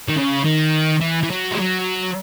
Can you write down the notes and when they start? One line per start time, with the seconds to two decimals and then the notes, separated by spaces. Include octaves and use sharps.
0.09 D#3
0.17 C#3
0.45 D#3
1.01 E3
1.23 E3
1.30 F#3
1.52 G#3
1.59 F#3